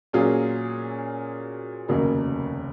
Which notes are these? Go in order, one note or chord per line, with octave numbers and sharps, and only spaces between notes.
A#2 F#3 C#4 F4 G#4
F1 D#2 C#3 F#3 A#3